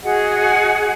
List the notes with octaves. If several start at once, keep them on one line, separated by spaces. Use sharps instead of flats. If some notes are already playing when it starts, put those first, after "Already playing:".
F#4 G#4 D#5 F#5